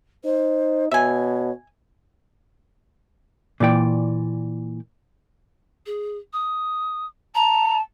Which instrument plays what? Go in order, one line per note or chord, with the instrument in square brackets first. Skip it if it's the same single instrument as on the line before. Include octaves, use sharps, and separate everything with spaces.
[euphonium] D#4 [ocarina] C5
[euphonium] B2 [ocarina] C#5 [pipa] E5 G#5
[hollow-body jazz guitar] A#2 E3 D5 G5
[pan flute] G#4
D#6
[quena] A5 [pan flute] A#5